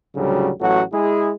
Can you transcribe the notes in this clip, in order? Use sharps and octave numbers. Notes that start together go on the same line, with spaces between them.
D2 A2 C#3 F#3 G3
A1 F#3 A3 F#4
G#3 E4 G#4